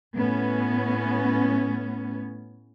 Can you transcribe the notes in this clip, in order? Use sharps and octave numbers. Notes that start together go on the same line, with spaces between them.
A2 B3 C#4